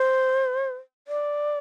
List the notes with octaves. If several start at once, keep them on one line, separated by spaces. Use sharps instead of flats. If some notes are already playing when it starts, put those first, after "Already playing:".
Already playing: C5
D5